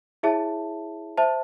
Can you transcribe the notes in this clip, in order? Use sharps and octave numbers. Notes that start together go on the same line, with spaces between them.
E4 G#4 C#5 E5 A5
C5 E5 A5